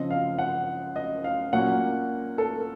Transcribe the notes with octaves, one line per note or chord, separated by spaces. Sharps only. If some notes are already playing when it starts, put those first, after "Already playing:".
Already playing: C#3 F3 C4 D#5
F5
F#5
D#5
F5
A#2 F#3 A#3 C#4 F#5
A4